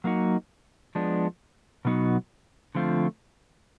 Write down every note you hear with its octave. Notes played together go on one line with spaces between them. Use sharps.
F#3 A#3 D#4 F#4
F3 G#3 B3 D4
B2 F#3 B3 D#4 F#4
D3 F3 A3 C4 F4